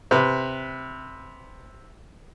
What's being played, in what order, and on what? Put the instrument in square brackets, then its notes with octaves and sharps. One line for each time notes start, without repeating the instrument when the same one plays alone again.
[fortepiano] C3 B4